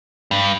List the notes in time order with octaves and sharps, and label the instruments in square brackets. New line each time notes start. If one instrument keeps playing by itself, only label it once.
[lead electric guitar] G2